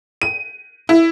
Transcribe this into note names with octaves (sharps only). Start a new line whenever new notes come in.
D#7
E4